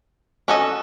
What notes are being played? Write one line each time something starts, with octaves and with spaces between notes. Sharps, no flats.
C#4 F#4 A4 D#5